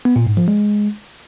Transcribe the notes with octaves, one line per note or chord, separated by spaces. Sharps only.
B3
A#2
G#2
F3
G#3